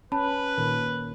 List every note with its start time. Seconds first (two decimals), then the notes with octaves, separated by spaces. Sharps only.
0.12 C#4 B4 A5 B5
0.58 A#2 D#3